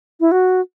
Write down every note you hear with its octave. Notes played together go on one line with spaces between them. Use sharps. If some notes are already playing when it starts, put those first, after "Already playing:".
E4
F#4